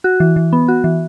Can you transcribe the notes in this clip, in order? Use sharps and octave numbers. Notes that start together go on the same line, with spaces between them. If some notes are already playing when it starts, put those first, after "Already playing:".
F#4
E3
E3
B3
F#4
E3